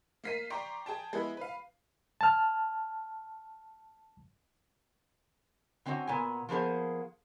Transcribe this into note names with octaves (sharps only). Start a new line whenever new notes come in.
A#3 F5 B6 C7 D#7
D5 G5 A#5 C6 C#6 C7
G#4 G5 A5
G#3 B3 E4
B4 F5
A5 F6
D3 C4 C#4 D#4 F#4
A#2 B3 G#5
F3 A#3 B3 G#4 C5